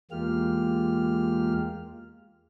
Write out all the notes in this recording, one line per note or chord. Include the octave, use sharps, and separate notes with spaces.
E2 G#3 A#3 F4 G4 F6